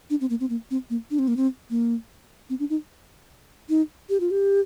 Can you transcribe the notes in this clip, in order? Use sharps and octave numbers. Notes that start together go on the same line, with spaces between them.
D4
C4
A#3
C4
A#3
C4
A#3
D4
C4
A#3
C4
A#3
C4
D4
D#4
D#4
G4
F4
G4